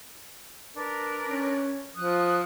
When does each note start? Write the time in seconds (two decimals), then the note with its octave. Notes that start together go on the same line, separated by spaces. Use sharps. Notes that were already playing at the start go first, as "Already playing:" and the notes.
0.74 D4 A#4 B4
1.23 C#4
1.95 F3 D#6 F#6